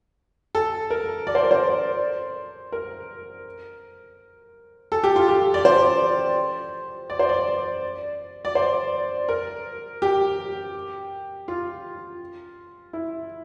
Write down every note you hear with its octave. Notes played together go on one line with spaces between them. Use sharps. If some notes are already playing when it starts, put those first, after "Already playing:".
A4
A#4
D5
C5
A#4
C5
A#4
A4
G4
F4
G4
D5
C5
D5
C5
D5
D5
C5
A#4
G4
F4
E4